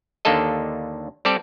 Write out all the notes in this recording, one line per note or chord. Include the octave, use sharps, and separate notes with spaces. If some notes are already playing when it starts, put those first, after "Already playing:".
D#2 D3 A#3 D4 A4 D#5
G3 C4 G4 A4 D5